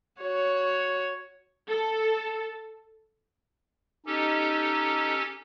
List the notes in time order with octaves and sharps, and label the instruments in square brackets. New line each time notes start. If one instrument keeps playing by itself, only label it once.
[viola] F#4 C#5
[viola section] A4
[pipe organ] C#4 G4 A4 [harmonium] D#4